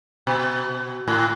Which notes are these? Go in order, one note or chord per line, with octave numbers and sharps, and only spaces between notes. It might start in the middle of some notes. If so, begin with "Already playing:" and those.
B2
A2